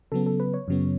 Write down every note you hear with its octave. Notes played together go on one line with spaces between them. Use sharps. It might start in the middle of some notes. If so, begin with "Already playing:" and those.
C#3 F#3 B3 A4
A4
B4
C#5
F#2 C#3 F#3 B3